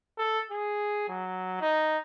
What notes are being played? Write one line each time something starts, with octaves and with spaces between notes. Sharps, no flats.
A4
G#4
F#3
D#4